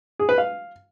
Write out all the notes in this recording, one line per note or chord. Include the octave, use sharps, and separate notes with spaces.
G#4
B4
F5